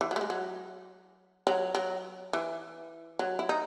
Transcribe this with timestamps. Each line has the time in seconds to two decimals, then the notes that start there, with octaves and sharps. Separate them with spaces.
0.01 E3
0.11 F#3
0.16 A3
0.21 G#3
0.30 F#3
1.47 F#3
1.75 F#3
2.33 E3
3.19 F#3
3.39 E4
3.49 D#4